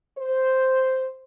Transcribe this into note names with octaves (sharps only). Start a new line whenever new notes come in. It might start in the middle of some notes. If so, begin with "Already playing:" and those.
C5